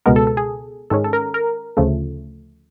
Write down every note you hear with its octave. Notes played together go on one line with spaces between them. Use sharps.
C#2 B2 G#3 B3 A#4
A4
A4
G#4
G#2 D#3 G#3 C#4 A4
A4
A#4
A#4
D2 C#3 F3 A3